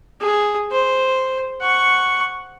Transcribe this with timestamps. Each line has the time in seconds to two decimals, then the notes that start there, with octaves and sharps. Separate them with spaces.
0.21 G#4
0.71 C5
1.61 F#5 C#6